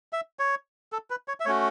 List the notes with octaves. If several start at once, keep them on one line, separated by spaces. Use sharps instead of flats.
E5
C#5
A4
B4
C#5
E5
A3 C#4 F#4 C#5